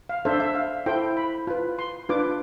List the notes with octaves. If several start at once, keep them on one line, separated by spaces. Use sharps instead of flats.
F5
D4 A4 C5 E5
E5
F5
E4 A4 C5 G5
B5
F4 B4
C6
D4 F4 B4 D6